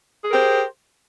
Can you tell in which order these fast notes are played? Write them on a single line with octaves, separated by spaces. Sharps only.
G#4 A#4 G4 C5